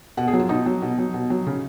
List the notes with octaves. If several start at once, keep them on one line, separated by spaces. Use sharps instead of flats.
B2 F#5
G#4
F#3
F4
B2 D#4
F#3
B2
F#3
B2
F#3
C#3